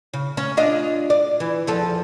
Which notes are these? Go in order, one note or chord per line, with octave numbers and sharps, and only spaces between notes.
C#3
C#4
D4 F4 D#5
D5
E3
E2 F3 A4